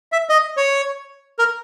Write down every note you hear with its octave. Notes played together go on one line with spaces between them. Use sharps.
E5
D#5
C#5
A#4